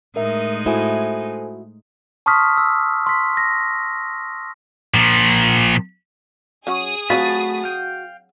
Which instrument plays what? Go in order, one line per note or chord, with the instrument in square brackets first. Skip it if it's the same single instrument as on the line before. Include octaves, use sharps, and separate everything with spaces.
[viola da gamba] A2 G#3 D#4 [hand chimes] A#4 E5
[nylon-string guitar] E4 F#4 [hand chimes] A4 C5 G#5
[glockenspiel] A5 C6 C#6 D#6 F6 B6
E6
C6 B6
A#6
[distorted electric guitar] A#2 F3
[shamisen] F#3 C#4 F#4 [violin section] G#4 D#6
[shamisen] F#3 C4 F4 [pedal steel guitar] A3 A5 B5 [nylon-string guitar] F#4
[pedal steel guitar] F5 G5